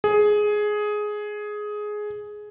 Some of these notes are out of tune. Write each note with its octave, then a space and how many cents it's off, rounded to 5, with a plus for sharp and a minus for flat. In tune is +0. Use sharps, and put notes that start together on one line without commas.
G#4 +10